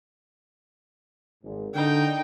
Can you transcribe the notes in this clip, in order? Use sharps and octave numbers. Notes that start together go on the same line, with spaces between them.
G#1 G#2
D3 D#4 G5